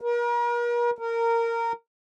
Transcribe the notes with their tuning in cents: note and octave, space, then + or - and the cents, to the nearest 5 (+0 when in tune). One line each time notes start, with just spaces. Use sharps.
A#4 +40
A#4 -15